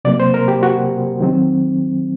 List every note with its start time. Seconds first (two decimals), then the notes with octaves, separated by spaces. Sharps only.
0.05 C3 F#3 A#3 D5
0.20 C5
0.34 A#4
0.48 G4
0.63 F#4
1.20 D#3 F#3 C4